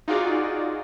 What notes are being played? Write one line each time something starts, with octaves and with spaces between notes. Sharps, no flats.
D#4 F4 F#4 G#4 D5